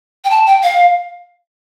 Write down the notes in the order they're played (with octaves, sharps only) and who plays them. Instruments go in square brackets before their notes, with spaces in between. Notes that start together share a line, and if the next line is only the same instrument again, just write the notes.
[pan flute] G5
A5
G5
F5